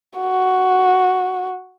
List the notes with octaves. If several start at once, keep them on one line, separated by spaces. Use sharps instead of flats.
F#4